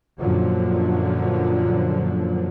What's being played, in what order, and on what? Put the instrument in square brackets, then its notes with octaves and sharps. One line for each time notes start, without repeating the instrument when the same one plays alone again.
[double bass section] F#2 A#2 D3 F3 F#3